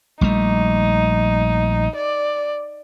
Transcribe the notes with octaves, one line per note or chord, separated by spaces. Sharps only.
A#1 G3 A3 D#4
D5